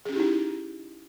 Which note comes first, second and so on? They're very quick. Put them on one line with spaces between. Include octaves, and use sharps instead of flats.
G#4 C#4 G4 E4 D#4